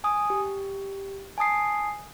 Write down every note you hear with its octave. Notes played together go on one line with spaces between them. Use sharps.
G#5 D#6
G4
G#5 A5 D#6 C7